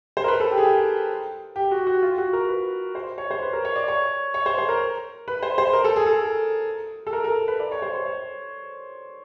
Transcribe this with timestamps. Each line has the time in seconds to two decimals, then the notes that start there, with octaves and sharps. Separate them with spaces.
0.17 C5
0.24 A#4
0.28 B4
0.40 A4
0.51 G4
0.58 G#4
0.63 G4
1.56 G4
1.71 F#4
1.87 F#4
2.03 F4
2.18 F#4
2.33 A#4
2.49 B4
2.95 C5
3.18 C#5
3.31 C5
3.42 B4
3.53 A#4
3.65 C#5
3.76 D5
3.88 C#5
4.34 C#5
4.46 C5
4.58 C5
4.69 A#4
5.28 B4
5.43 C5
5.58 C5
5.73 A#4
5.84 A4
5.96 G#4
6.06 A4
7.07 A4
7.13 A#4
7.24 A#4
7.48 B4
7.60 D5
7.71 C#5
7.82 C5
7.94 C#5
8.06 C#5